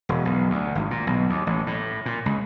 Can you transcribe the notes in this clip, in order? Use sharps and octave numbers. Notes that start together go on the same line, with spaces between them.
E1
B1
D2
G#1
A#2
B1
D#2
A1
A2
A#2
C#2